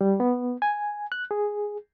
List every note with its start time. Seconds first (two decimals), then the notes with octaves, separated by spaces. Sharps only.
0.01 G3
0.20 B3
0.62 G#5
1.12 F#6
1.31 G#4